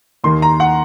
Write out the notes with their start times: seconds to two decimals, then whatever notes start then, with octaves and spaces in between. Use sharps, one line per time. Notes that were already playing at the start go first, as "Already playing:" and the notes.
0.24 D#2 D#3 A#3 C6
0.42 A#5
0.60 F#5